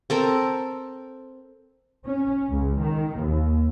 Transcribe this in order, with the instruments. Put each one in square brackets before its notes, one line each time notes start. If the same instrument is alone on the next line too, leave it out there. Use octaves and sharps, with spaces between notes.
[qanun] C4 A4 A#4
[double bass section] C#4
C#2
D#3
D#2